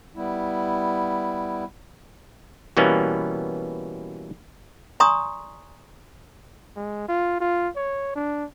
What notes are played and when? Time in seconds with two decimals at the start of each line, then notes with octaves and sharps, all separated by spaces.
0.16 G3 B3 E4
2.77 B2 E3 G3 A#3 B3 C#4
5.00 D5 G#5 A#5 C6 C#6 D#6
6.76 G#3
7.08 F4
7.40 F4
7.76 C#5
8.16 D4